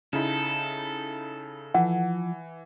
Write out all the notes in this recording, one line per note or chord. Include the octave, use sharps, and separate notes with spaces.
C#3 D#4 E4 A4
E3 F3 F#5